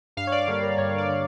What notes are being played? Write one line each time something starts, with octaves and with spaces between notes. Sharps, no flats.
G2 F5
C#5
D5
D3 G3 A#3 C#5
A#4
G2 C#5
D5
D3 G3